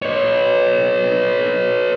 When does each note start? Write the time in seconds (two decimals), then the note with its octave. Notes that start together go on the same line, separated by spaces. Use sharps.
0.02 B4 C#5